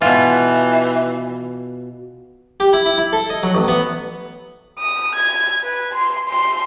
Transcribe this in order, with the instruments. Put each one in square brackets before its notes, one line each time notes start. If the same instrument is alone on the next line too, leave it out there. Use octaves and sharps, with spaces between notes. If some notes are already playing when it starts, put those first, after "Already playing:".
[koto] B2 F4 [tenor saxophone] E3
[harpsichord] G4
E4
E4
E4
A4
D#5
F#3
A1
B3
[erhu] D#6
G#6
B4
C6
C6